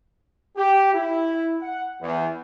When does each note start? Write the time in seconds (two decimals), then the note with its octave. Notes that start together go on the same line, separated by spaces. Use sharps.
0.57 G4
0.93 E4
1.61 F#5
2.01 E2